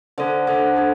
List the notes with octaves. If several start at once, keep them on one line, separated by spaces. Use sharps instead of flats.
D3 D4 A4 C5
D3 D4 A4 C5
D4 A4 C5